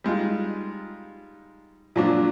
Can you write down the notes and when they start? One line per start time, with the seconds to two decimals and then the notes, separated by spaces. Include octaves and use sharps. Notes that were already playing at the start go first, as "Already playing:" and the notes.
0.04 G3 G#3 D#4 F4
1.96 A#2 F3 F#3 G#3 D4